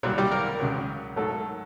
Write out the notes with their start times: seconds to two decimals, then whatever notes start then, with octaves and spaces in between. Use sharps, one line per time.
0.03 C2 A#2 F#3 G3 C4 F#4
0.18 G3 G4
0.31 A#3 A#4
0.60 C#2 C#3 F#3
1.16 G#2 D#3 F#3 A3 A4